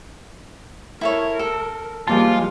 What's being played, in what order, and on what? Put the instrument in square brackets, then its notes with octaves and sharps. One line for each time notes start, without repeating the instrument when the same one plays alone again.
[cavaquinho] E4 A4 C#5 [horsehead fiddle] A#4
[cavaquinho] A4
[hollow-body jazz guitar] F3 A#3 A5 [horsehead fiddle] G3 G#3 [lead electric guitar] F4